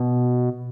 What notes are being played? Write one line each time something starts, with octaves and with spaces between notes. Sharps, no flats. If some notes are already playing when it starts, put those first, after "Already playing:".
Already playing: B2